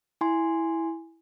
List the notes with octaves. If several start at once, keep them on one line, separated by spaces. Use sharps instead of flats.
E4 G#5 C6